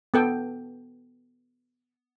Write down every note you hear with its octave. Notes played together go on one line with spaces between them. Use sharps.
B3 A4 G5